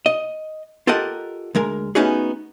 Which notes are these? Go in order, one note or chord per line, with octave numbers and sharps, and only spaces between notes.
D#5
F4 G4 A4 A#4 D#5 F#5
D2 G#3 A#4
A3 B3 C#4 D#4 F#4 G#4